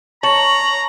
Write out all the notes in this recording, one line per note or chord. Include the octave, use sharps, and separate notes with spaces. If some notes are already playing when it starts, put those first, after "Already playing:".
C#5 A5 A#5 F#7